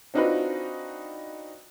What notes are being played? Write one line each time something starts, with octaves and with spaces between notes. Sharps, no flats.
C4 D4 D#4 F4 F#4 B4